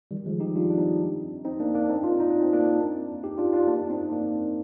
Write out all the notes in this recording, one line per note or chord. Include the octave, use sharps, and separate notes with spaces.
D#3 G3
F3 G#3
D#4 G4
D4 F4
D4
C4 D#4
C4 D#4
A#3 D4
A#3 D4
C4 D#4
D4 F4
D#4
D4
C4
A#3 D4
D#4 G4
D4 F4
D4 F4
A#3 D4
D4
C4 D#4
A#3 D4